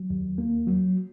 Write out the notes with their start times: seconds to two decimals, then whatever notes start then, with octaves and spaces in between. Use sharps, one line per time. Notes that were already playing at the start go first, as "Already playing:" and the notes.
Already playing: F#3
0.10 D#2
0.38 A#3
0.67 F#3